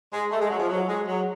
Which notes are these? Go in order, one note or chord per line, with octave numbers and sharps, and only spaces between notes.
G#3
A3
G#3
F#3
F3
F#3
G#3
F#3